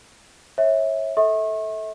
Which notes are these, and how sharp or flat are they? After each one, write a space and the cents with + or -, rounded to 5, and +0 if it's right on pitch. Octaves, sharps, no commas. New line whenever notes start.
C#5 -25 E5 -20
A4 +0 E5 -35 C#6 -40